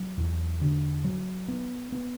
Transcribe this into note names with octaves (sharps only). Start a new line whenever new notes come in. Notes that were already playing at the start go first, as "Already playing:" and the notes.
Already playing: F#3
E2
D3
F#3
B3
B3